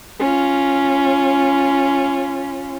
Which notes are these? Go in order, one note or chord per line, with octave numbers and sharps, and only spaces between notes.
C#4 F4